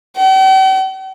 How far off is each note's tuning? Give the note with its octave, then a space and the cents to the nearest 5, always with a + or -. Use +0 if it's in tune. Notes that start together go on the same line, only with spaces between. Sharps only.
G5 -45